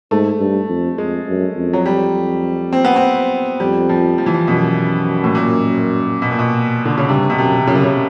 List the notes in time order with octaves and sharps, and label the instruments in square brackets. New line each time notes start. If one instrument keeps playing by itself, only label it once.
[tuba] G#2 [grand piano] A3
[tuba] G2
F2
[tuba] F2 [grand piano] G#3
[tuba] F#2
F2
[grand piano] F#3
G3
C4
B3
C4
[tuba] F2 [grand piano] G3
[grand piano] F3
F3
E3
F3
[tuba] F#2 [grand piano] B2
[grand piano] A2
A#2
B2
A#2
B2
D3
C#3
[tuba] G2 [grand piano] C3
[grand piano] B2
[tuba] F#2 [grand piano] C3
[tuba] F#2 [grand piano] C#3
[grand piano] C3
C#3